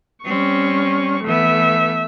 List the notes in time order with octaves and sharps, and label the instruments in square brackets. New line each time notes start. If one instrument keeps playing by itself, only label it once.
[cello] G3 C4 [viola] C#4 C#6
[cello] E3 B3 [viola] A3 E5